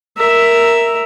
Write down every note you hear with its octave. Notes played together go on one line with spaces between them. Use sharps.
A#4 E5